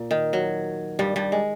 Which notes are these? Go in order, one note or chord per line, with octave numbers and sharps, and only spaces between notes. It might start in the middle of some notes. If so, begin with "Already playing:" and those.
Already playing: A#2
D#3
F#3
G2 G3
G2 G3
G#3